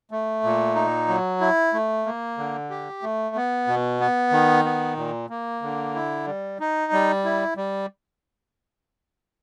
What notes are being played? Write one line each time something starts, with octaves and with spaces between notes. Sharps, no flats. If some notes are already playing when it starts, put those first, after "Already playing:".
A3
A#2
D#4
F#3
E4
A3
A#3
D3
G4
A3
B3
B2
B3
D#3
B3
A#2
A#3
D3
E4
G3
D#4
G3
E4
G3